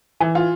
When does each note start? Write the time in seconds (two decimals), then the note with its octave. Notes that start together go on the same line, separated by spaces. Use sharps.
0.20 E3
0.35 F4